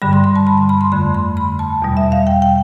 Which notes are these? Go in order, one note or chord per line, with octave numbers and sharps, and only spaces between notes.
G2 D3 G3 B5
C6
C6
A5
B5
C6
B5
C6
F2 D3 A3 B5
C6
B5
A5
E2 B2 G3
E5
F5
G5
G5